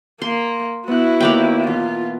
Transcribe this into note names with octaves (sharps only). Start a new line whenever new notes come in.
A#3 C6
B3 E4 F#4 F#6
D#2 A#3 D#4 D5 G5
B2 E3 F4